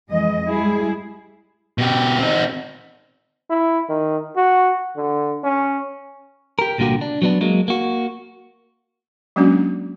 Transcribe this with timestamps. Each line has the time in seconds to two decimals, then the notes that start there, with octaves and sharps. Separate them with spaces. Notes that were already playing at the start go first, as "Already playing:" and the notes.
0.10 F2 E3 G#3 D#5
0.48 G3 G#3 E4 G#4
1.78 B2 G4
2.19 C4 D#4
3.50 E4
3.89 D#3
4.36 F#4
4.96 D3
5.44 C#4
6.59 G4 A#4
6.78 C2 A#2 D3 A#3 F#4 G4
7.01 D4
7.22 F#3 B3 D4
7.41 F#3 G#3 A#3
7.68 A#3 F#4
9.36 F#3 G#3 A#3 C#4 D4 F#4